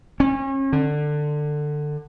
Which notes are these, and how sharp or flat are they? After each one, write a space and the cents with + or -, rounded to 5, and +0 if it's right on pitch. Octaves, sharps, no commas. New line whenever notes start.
C#4 -35
D3 +20